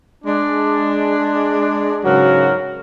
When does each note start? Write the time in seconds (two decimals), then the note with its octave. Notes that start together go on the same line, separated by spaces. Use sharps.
0.25 G#3 D4
2.04 G#2 C#3 F#3 F#4 A#4